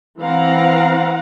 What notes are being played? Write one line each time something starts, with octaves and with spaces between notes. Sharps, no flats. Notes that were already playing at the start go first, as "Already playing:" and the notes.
E3 C4 F5 F#5 A#5